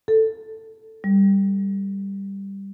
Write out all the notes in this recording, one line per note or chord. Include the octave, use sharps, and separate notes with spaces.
A4
G3